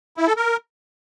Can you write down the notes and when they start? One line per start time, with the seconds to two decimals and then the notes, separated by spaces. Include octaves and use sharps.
0.17 E4
0.27 A4
0.37 A#4